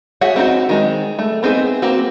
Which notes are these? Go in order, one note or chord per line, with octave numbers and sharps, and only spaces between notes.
F#4 G#4 C#5 E5 F#5
C4 D#4 E4 F#4
D#3 G#3 C4
A3
B3 C4 D#4 G#4
A#3 C4 F#4